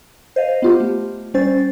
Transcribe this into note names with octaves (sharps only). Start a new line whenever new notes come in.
C5 D#5 F5
B3 F4 G4
A3
G3 C#4 C5 A6